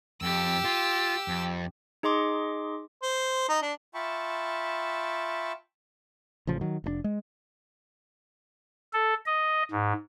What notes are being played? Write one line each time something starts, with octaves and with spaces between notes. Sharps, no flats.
F2 G4 E6
F4
F2
D#4 G#4 D#5 C6 D6
C5
D#4
D4
F4 E5 G5 A5 B5 C#6
A1 C#3 F3
D#3 F#3
F1 A2 D4
G#3
A4
D#5
G#2